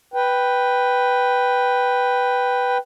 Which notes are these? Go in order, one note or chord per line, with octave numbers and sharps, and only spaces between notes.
B4 G5